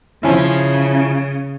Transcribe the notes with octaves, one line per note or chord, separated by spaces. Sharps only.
C#3 F3 C#4 E4